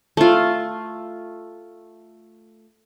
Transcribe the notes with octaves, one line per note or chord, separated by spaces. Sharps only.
A3 F4